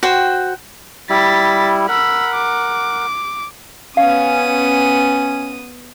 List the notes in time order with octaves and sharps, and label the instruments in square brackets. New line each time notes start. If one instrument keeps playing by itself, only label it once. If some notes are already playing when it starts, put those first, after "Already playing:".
[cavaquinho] F#4 C5 G5
[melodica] G3 E4 [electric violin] A6 B6
[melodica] A#4 F#5 [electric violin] B5 E6
[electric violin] D6
[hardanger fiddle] B3 D#6 [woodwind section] C#4 [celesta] F5